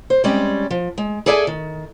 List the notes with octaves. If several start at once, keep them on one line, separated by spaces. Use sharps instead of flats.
C5
G3 G#3 C4 C#4 D5
F3
G#3
G#4 A4 D5 E5 F5 G#5
D#3